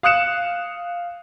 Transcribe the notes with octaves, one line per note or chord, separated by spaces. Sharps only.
F5 D#6 F#6 C#7 E7